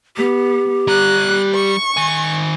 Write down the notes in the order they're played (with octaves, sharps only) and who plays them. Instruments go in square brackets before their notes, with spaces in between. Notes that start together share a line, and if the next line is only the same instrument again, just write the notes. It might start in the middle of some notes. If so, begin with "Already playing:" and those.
[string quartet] B3 [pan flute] G4
[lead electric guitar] G3 A#5 [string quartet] F#6
[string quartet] C#6
[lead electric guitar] D#3 G#5